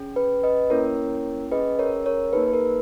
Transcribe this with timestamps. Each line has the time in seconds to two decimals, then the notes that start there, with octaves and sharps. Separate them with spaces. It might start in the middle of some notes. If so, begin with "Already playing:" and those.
Already playing: C#4 G#4
0.16 B4
0.43 B4 D#5
0.70 A#3 C#4 E4 A#4 C#5
1.51 C#4 G#4 B4 D#5
1.79 A#4 C#5
2.06 A#4 C#5
2.33 A#3 D#4 G#4 B4
2.48 B4
2.53 A#4